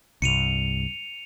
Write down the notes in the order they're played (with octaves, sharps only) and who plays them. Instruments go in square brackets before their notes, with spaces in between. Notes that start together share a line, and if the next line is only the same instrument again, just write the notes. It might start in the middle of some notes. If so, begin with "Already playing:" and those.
[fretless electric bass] C2 G2 [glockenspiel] C#7 D#7 F7